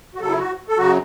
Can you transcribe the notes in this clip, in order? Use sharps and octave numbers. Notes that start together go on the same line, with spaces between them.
F#4
F#2 C#3 F#3 A4
E4
F#4
A4
F#2 C#3 F#3 F#4